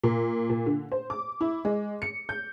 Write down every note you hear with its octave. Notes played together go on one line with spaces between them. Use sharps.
A#2
A#2
D3
C5
D6
E4
G#3
C#7
G6